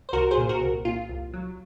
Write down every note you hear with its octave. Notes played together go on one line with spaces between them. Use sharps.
C5
C2 F#4 A#4
G#4 C5
A#2
F#4 A#4
C2
A#2 F4
C2
F#3